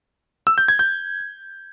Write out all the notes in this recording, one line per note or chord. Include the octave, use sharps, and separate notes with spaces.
E6
G6
G#6
G6